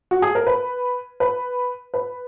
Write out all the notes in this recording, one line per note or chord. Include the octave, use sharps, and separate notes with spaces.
F#4
G#4
A#4
B4
B4
B4